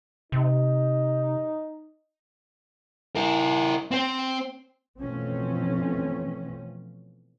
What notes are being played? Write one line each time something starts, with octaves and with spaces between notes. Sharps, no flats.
C3 D#4
E4 A#4
C4 C5
B2 E3 F3 A3 C4 C#4